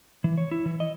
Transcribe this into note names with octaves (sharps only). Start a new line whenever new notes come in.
E3
C#5
E4
E3
D#5